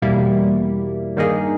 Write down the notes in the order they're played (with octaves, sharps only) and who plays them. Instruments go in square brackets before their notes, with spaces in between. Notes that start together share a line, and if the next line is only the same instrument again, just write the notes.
[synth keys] E2 B2 G3 A#3 E4
G2 D#3 A#3 D#4 G#4